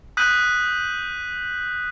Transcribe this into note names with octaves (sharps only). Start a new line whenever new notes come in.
D#6 F#6 G6 B6 D#7 F#7